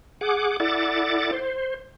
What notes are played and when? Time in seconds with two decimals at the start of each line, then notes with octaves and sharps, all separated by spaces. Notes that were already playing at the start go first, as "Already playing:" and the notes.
0.21 G#4 F#5 D6
0.60 E4 A4 D5 F#5 D6 A6
1.32 C5